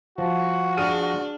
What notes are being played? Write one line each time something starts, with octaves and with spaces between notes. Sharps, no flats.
F3 F#4
D4 G#4 F6 D#7